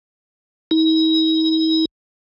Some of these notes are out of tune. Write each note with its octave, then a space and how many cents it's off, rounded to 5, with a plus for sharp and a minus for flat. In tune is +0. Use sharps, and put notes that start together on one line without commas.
D#4 +45